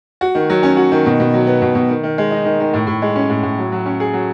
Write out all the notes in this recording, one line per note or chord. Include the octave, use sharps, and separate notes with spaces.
F#4
D#3
F#3
C#4
F#4
D#3
B2
B2
F#3
B3
B2
B2
D#3
D#3
G#3
D#4
D#3
D#3
A2
A2
G#3
C#4
A2
A2
F#3
F#3
C#4
G#4
F#3